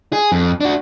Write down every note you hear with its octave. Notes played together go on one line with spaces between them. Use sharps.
G#4
F2
D4 F#4